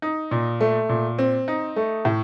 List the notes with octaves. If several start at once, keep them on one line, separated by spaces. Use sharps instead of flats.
D#4
A#2
A3
A#2
C4
D#4
A3
A2